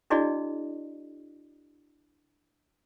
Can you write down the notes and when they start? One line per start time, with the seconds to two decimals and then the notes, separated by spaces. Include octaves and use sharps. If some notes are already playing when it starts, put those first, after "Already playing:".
0.10 D4 E4 F#4 G#4 D5 D#5